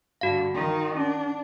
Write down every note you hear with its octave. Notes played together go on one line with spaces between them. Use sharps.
G2 D3 F#4 F5
D#3 D#4
C#4 D4